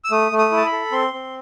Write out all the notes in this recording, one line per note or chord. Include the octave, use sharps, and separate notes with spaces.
E6
A3 D#6
A3
D#6
E4
A5
B5
A4
C4 C6
C4